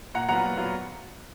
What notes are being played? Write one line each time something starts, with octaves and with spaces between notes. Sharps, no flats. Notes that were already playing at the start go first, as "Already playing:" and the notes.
A#2 F#5 A#5
F#3 B3 F4 F#5 A#5
A#2
F#3 B3 F4